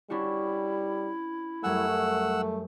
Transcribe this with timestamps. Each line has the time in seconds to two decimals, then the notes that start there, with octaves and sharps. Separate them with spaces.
0.10 G3 C#4 D4 E4 F#4
1.64 F#2 G3 A3 F#5 G#5 E6